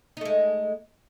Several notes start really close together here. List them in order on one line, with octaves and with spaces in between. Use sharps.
D#4 A3 G#3